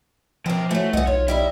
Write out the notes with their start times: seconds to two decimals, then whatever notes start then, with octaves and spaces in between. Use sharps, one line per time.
0.46 B2 F3 C4 A#4 C5
0.71 E3 F#3 A3
0.93 C2 E3 D#5 F#5
1.07 B1 F4 C#5
1.28 G3 D#4 E4 E5